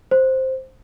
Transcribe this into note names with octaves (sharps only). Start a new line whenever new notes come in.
C5